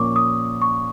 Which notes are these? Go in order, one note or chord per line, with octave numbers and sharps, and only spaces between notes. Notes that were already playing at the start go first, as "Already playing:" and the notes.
Already playing: A#2 F3 A#3 C#4 C#6 D6
D#6
C#6